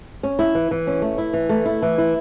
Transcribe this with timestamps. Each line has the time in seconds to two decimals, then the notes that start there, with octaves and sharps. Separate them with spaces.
0.23 C#4
0.39 E4
0.55 E3
0.71 E3
0.87 C#4
1.02 A3
1.18 E4
1.33 E3
1.49 A3
1.65 E4
1.82 E3
1.98 E4